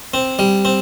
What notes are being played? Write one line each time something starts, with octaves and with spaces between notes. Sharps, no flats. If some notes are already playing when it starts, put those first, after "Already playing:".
C4
G3
C4